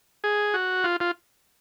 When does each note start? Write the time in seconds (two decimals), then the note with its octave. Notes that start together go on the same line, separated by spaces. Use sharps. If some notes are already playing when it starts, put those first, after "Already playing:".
0.24 G#4
0.54 F#4
0.84 F4
1.00 F4